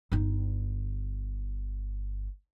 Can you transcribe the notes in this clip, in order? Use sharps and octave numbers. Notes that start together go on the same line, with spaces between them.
G1 D#4